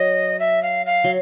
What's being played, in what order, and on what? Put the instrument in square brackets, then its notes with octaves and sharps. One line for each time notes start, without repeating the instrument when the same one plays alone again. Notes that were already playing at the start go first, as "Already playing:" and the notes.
Already playing: [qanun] F#3 [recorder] D#5
[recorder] E5
F5
F5
[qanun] F#3